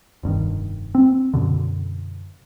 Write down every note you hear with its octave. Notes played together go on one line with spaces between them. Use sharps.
F1 G2 C3 D#3
C4
F#2 B2 D3